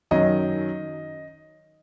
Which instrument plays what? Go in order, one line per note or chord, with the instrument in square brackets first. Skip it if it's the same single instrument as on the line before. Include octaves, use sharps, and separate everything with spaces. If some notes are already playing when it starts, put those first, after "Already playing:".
[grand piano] F#2 D#3 F#3 D#5